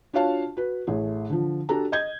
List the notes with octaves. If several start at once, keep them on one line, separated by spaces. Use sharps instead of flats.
D4 F4 F#4 C#5 F5 A5
F#4 B4
A1 A3 G#4
D3 F3
D4 F#4 G4 A4 A#5
D#5 G6 G#6